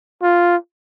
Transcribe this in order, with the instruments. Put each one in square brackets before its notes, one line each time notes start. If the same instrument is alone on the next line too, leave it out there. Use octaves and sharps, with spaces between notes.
[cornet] F4